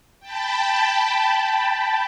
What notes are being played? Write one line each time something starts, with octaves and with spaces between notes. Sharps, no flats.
G5 A5 B5